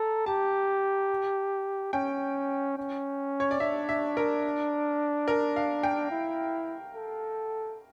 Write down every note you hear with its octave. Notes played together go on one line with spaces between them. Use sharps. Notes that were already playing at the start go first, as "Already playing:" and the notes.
Already playing: A4 A#5
G4 A5
C#4 G5
C#4
C#5
D5
D4 E5
E5
A#4
A#4
F5
G5
E4
A4